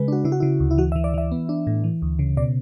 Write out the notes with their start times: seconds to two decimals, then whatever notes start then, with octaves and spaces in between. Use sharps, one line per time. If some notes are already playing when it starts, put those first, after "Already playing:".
Already playing: C#3 G#3 B4
0.08 D4 F#4
0.25 C#3 E4
0.32 F#4
0.40 C#3 E4
0.60 D2
0.71 E4
0.78 E3 F#4
0.92 E5
0.96 E3
1.04 D5
1.14 E3 E5
1.32 B3
1.49 D4
1.67 A2
1.84 E3
2.02 D2
2.19 C#3
2.37 B2 D5